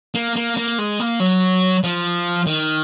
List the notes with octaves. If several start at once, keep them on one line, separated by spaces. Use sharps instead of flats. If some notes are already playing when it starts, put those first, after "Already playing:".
A#3
A#3
A#3
G#3
A#3
F#3
F3
D#3